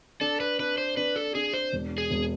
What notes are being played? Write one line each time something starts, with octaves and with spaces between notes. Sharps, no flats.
D4 A4
B4
D4 B4
C5
D4 B4
A4
D4 G#4
C5
E1
G#4
E1